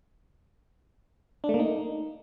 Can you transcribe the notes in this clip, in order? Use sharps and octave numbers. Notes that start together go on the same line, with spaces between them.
D4
A3
A#3
D#4